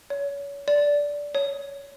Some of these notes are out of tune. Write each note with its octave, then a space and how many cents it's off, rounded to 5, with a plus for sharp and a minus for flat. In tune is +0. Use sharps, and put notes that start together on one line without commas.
C#5 +30
D5 -10
C#5 +10